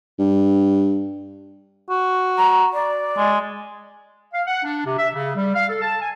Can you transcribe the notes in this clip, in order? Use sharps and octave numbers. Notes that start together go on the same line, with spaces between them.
G2
F#4
A#5
D5
G#3
F5
F#5
D4
C3
E5
C#3
G3
F5
A4
A5
G#5